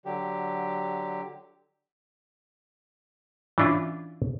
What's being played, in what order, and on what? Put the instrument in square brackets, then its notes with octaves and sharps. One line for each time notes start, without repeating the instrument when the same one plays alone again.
[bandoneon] D3 F#3 G4
[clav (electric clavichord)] E3 C#4 D4 E4 F4